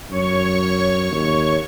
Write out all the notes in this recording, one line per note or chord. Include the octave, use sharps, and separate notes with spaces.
F#2 C#5 C#6
D#2